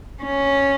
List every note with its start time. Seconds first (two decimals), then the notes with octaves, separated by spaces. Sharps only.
0.23 C#4